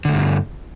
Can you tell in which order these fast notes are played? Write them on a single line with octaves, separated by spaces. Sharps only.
D3 A3 G2